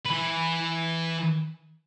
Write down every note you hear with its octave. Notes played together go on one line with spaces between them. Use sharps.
E3 B4